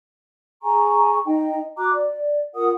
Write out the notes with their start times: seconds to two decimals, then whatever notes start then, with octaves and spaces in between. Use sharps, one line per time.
0.63 G#4 G#5 A#5 C#6
1.26 D#4 D#5 G5
1.78 F#4 A#5 D6 F#6
1.94 D5
2.55 F4 A#4 F#5 D#6